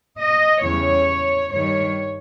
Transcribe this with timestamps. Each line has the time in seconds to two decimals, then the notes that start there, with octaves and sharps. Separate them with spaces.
0.19 D#5
0.62 E2 C#3 E3 G3 C#5
1.51 G2 D#3 G3 C#5